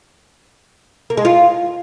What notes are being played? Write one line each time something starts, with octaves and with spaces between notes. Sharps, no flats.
A#3
G#3
F4